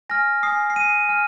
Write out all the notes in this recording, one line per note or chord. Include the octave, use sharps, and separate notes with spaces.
G#5 F6 A#6
G#5 D#6 C7
C7
G#5 D#6 D#7
G#5 F6